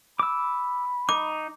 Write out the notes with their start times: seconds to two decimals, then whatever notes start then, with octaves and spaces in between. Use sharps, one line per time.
0.19 B5 D6 E6
1.09 D#4 D6